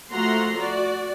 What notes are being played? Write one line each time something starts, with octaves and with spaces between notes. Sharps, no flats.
F3 A3 F#4 F#5 A#5 C6
F#4 D5